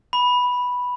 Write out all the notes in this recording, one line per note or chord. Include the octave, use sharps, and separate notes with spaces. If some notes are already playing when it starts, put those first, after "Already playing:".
B5